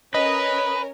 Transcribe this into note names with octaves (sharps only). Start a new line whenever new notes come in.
C#4 A#4 B4 D#5